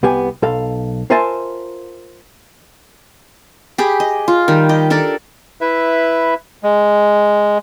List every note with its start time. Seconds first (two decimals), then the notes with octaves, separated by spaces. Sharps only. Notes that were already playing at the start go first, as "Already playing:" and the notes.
0.03 C2 B3 G4 G#5
0.42 B1 A4 F5
1.10 F4 A#4 C5 E5 G#5 A5
3.78 G4 G#4 B5
4.00 D#5
4.28 F4
4.48 D#3 G3
4.69 G4 D#5
4.90 D4 A4 A#4 D5
5.61 E4 B4 E5
6.63 G#3